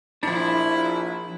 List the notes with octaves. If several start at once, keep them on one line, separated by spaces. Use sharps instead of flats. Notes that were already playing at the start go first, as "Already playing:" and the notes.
A#1 F3 D4 E4